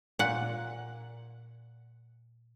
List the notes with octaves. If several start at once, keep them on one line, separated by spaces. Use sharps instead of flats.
A#2 F#5